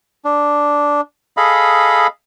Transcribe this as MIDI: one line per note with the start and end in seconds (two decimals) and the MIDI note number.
0.25 1.01 62
1.37 2.07 68
1.37 2.07 69
1.37 2.07 75
1.37 2.07 77
1.37 2.07 83